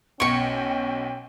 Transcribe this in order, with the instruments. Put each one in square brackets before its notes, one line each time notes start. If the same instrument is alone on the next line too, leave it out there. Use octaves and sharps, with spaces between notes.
[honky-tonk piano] B1 D7 [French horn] C#4 [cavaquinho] C#5 C#6 [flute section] G5